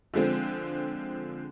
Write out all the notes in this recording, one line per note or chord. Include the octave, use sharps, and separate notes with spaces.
D3 F3 G#3 C4